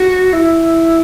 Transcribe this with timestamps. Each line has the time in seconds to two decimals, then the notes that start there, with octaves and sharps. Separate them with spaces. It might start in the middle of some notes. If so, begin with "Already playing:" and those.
Already playing: F#4
0.33 E4